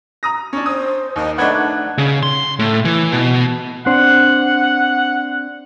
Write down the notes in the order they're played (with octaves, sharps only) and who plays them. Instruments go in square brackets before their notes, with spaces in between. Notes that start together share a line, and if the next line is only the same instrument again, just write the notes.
[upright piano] A#5 D#6 A#6
C#4 D4
[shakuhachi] C5 [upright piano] D#6
[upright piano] D#2 [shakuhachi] D#5
[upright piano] A3 D#4 B4 [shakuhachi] D4 [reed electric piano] F#5 F#6 G#6
[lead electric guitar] C#3
C6
A2
E3
B2
[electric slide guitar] C4 D4 C5 [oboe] F#5